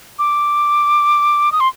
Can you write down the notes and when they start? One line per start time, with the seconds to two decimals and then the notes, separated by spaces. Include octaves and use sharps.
0.19 D6
1.52 D#6
1.60 C6